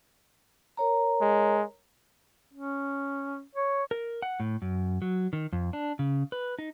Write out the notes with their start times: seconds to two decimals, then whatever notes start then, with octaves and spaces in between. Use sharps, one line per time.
0.77 A#4 C#5 A#5
1.21 G#3
2.53 C#4
3.55 C#5
3.91 A#4
4.22 F#5
4.40 A2
4.62 F#2
5.02 F#3
5.33 D#3
5.52 F2
5.73 D4
5.99 C#3
6.32 B4
6.59 D#4